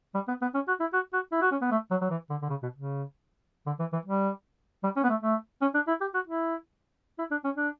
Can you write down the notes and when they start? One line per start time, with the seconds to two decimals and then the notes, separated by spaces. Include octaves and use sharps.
0.14 G3
0.28 B3
0.41 B3
0.54 C#4
0.68 F#4
0.80 E4
0.93 F#4
1.13 F#4
1.32 E4
1.42 F#4
1.51 C#4
1.61 B3
1.71 A3
1.91 F#3
2.01 F#3
2.10 E3
2.30 D3
2.42 D3
2.49 C#3
2.62 B2
2.75 C#3
3.66 D3
3.79 E3
3.93 E3
4.05 G3
4.84 G3
4.96 C#4
5.03 B3
5.10 A3
5.22 A3
5.61 C#4
5.74 D4
5.87 E4
6.01 G4
6.14 F#4
6.27 E4
7.18 E4
7.31 D4
7.44 C#4
7.57 D4